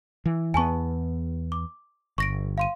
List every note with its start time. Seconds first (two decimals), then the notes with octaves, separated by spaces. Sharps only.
0.26 E3
0.54 E2 B3 G#5 A5 C#6
1.52 D6
2.18 G1 C#6 A#6 D7
2.58 F5 C6 D#7